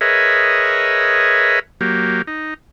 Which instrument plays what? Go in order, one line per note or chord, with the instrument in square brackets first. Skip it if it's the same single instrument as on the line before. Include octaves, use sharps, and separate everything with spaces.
[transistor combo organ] G#4 A#4 B4 C#5 D#5 E5
F#3 A#3 G4
D#4